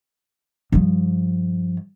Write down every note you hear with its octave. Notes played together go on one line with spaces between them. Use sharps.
G2 F3